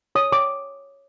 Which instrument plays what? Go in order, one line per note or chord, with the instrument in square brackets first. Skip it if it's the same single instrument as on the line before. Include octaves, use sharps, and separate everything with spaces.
[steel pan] C#5 D#6
C#5 D6